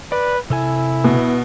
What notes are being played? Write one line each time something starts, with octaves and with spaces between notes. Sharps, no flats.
B4 D5
C3 E4 A4 G#5
B2